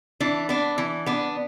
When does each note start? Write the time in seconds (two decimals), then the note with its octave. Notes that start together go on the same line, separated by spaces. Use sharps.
0.20 E3 D4
0.49 B3 D4
0.78 E3
1.06 B3 D4